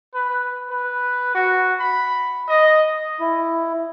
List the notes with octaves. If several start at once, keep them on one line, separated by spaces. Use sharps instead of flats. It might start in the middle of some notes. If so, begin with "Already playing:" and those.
B4
B4
F#4
B5
D#5
E4